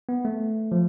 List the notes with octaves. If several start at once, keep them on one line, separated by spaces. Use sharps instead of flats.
B3
A3
F3